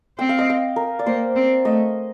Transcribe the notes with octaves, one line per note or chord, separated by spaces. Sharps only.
C4 G5
F5
D#5
F5
A#4
D5
A#3 C5
C4
A3 D#5